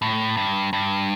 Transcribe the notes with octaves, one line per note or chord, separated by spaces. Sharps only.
A2
G2
G2